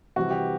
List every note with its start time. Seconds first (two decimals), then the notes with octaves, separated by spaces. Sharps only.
0.16 C3 E3 G3 F#4
0.31 G4